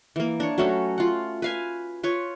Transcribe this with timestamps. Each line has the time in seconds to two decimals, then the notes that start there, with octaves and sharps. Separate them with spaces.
0.16 E3 A#3
0.40 D4 C#5
0.58 F#3 A3 C#4 F#4
0.98 F4 F#5
1.42 B4 F5 G#5
2.03 F4 B4 C#5